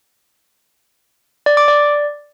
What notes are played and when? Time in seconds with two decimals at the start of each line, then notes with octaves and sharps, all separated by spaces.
1.46 D5
1.57 D6
1.68 D5